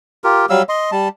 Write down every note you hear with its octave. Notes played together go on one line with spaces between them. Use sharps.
F4 G4 A#4
F#3 G3 F5 E6
D#5 C6
G3 A5